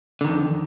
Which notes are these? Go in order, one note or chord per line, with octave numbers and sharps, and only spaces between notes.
F2 D3 D#3